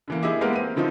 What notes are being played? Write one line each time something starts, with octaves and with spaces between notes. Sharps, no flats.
D3 E3 A#3
E4 G4 G#4 D#5 E5 D6
G#3 A#3 B3 G4 A#4 B4
C4 D#7
D3 D#3 F3 C4 D#4